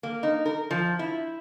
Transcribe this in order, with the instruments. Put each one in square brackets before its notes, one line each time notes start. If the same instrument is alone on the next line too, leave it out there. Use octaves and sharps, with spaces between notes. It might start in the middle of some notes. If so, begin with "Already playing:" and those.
[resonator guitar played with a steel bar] A#3
D#4
A#4
F3
E4